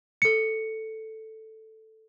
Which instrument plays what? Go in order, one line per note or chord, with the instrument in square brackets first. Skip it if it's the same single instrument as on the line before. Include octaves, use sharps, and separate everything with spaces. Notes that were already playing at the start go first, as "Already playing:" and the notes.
[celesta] A4 C#7